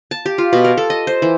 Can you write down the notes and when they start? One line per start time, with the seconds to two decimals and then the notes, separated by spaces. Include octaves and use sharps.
0.11 A5
0.26 G4
0.38 F4
0.53 B2
0.64 A#4
0.77 A4
0.90 D#5
1.07 C5
1.22 E3